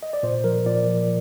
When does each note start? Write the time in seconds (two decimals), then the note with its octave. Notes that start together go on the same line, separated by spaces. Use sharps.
0.03 D#5
0.13 D5
0.23 A#2 C5
0.44 F3 A#4
0.66 A#2 D5
0.87 F3